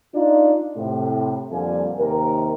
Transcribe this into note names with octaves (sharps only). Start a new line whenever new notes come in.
D4 D#4 F4
A2 C3
F2 A#2 D3 G3 F5 G#5
D#2 C3 A#4